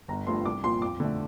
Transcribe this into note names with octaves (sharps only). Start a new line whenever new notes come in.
G1 A#5
G2 F3 A3 C6
C2 D6
A#2 F3 C6
F2 D6
D3 A3